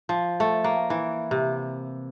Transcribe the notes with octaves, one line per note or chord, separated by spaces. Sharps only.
F3
A3
A#3
E3
C3